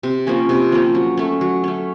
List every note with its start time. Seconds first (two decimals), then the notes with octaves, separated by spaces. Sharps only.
0.03 C3
0.27 F3 A#3 C#4
0.49 C3
0.72 F3 A#3 C#4
0.95 F#3
1.17 A3 C#4
1.41 F#3
1.64 A3 C#4